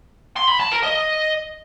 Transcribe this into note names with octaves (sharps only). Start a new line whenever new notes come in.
C6
B5
A5
A#4
D#5